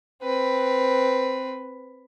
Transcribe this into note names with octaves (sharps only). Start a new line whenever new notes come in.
C4 B4